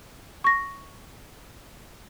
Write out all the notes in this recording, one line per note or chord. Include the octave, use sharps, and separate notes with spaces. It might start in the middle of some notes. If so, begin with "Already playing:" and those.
C#6 A#6